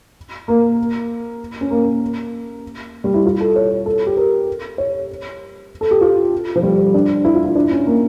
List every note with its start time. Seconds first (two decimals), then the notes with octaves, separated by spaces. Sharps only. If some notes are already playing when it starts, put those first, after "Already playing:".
0.48 A#3
1.61 C#4
1.71 A#3
3.04 G3
3.14 E4
3.25 F4
3.40 A4
3.56 C#5
3.86 A4
4.07 G4
4.17 A#4
4.78 C#5
5.81 A4
5.91 G4
6.01 F4
6.56 F3
6.63 G3
6.94 D4
7.25 E4
7.35 F4
7.46 E4
7.56 D4
7.71 C#4
7.87 A#3